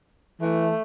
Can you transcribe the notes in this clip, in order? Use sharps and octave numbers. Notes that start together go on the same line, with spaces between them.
E3 A3